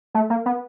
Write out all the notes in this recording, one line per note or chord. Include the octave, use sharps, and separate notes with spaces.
A3
A#3
B3